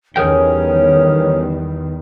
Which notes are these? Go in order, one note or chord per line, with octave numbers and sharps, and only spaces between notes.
E2 D#3 G3 C#4 G#4 A#4 C#5 G5